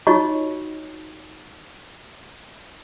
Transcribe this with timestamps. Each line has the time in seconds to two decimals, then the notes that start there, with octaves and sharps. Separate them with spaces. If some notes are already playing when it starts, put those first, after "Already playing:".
0.07 D#4 F4 F#4 C#5 D#5 C#6